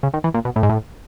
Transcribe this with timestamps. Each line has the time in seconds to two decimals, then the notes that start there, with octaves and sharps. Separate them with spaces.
0.03 C#3
0.14 D#3
0.24 E3
0.34 A#2
0.45 B2
0.56 A2
0.63 G#2
0.69 A2